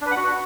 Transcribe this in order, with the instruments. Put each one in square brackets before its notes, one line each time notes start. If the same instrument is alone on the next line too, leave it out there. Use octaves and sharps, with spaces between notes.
[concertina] D4
B4
F#5
F#4